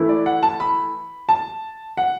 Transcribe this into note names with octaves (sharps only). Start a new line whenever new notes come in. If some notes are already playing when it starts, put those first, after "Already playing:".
Already playing: E3 A3 E4
D5
F#5
A5
B5
A5
F#5